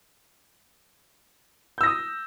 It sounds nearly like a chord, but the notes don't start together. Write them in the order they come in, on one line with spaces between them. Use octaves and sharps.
G6 E6 A#6 D#6